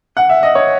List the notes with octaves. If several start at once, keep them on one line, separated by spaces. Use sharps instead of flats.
F#5
E5
D#5
C#5